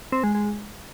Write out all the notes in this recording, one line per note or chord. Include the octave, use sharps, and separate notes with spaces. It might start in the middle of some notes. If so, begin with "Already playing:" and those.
C4
G#3
G#3